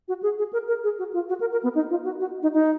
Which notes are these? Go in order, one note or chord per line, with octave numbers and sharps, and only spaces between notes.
F#4
G#4
G#4
A#4
A#4
G#4
F#4
F4
F#4
A#4
A#4
B3
D#4
F4
F#4
F#4
D#4
D#4